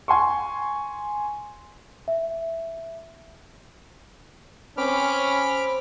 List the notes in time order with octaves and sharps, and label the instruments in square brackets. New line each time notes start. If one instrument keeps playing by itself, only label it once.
[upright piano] G#5 C6 C#6
[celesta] E5
[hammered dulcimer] C4 [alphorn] C#4 [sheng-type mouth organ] B5 D6 F6